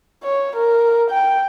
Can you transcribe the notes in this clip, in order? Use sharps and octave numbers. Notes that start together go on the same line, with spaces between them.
C#5
A#4
G5